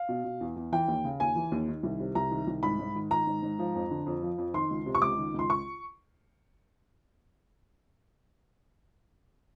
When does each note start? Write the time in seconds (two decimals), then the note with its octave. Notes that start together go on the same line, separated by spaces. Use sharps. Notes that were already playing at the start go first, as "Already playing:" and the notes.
Already playing: F5
0.09 B2
0.24 B2
0.41 E2
0.56 E2
0.72 E3 G5
0.88 D#2
1.04 C#3
1.20 D#2 G#5
1.36 E3
1.52 D#2
1.68 D#3
1.83 C2
2.00 C3
2.15 C2 A#5
2.31 D#3
2.47 C2
2.63 G#2 B5
2.79 G#2
2.95 D#3
3.11 D#3 A#5
3.27 G#2
3.43 G#2
3.59 F3
3.75 F2
3.91 D3
4.06 F2
4.23 F3
4.38 F2
4.54 D#3 C6
4.71 C#2
4.86 C3
4.95 C#6
5.02 C#2 D6
5.18 D#3
5.34 C#2 C6
5.50 C#6